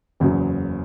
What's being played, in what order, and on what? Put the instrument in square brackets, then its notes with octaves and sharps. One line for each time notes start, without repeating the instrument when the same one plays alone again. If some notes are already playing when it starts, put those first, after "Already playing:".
[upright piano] F#1 E2 C#3 F#3